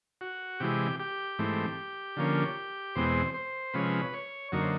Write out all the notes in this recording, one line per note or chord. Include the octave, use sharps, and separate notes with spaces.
F#4
C3 E3 G#3 G4
G4
G#2 E3 A3 C4
D3 F3 A#3 C#4
E2 B2 G#3 C4 C5
C5
C3 F3 G#3 C#4 B4
C#5
F#2 D3 F#3 A#3 D#4 C#5
C5